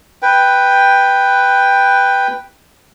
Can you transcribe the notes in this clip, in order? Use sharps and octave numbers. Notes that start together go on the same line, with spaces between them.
B4 G5